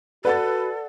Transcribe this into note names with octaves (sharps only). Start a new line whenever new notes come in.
F#4 A4 B4 D5 F#5 A6